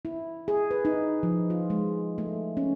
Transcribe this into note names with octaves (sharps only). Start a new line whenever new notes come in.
E4
G#4
B4
D#4
F3
F4
G#3
A3
C#4